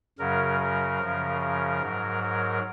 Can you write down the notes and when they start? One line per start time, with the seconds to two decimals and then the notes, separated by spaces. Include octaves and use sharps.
0.19 F#2 C#3 F#3 A#4
0.60 A#4
1.00 F#2 C#3 F3
1.40 A#4
1.81 G#2 F#3
2.23 A#4